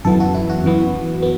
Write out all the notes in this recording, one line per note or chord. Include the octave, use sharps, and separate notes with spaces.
F#2 E3 B3 A4
F#4
E4
F#4
F#2 E3 B3
B3